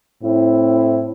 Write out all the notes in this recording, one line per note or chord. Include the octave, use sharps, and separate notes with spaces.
A2 C4 E4